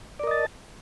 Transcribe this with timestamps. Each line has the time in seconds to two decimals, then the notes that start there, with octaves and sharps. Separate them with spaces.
0.19 D5
0.23 A#4
0.27 D#5
0.31 A5